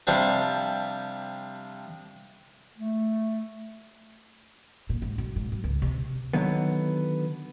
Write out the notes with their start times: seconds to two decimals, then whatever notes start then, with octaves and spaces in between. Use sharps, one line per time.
0.07 C3 F3 G3 D4
2.78 A3
4.89 A#2
5.02 G#2
5.18 B1
5.36 G#2
5.52 F#3
5.64 C#2
5.82 C3
6.33 D3 D#3 F#3 B3